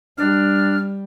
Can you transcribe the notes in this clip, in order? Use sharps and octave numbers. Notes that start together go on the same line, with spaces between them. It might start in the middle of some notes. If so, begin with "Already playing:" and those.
G3 D4 F6